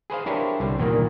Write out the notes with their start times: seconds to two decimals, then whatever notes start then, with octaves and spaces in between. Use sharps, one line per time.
0.10 G#4 B4 C5 F5
0.26 D4 E4 G4 A#4 C5 C#5
0.60 C2 D3 G3
0.79 E2 A#2 D#3 A#3